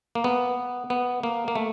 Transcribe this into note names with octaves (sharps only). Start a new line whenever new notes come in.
A#3
B3
B3
A#3
A#3
A3